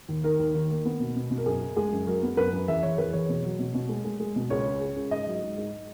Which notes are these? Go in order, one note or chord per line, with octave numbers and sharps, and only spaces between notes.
D#2
D#3 A#4
D#2
D#3
A#3
B3
B2
B2
B2
A#4
F#2 G#4
C#3
G#3 G#4
F#2
F#3 A#4
B3
F#2 B4
F#2
E2 E5
E2 C#5
E2 B4
E2 C#5
B2
F#3
B2
B2
G#3
G#3
G#3
B2
C#2 C#5
C#3
C#3
C#2
G#2 D#5
F#3
G#2
G#2